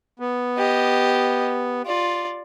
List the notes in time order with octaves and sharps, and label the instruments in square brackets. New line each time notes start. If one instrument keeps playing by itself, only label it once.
[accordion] B3
[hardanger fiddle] G4 D#5
F4 D5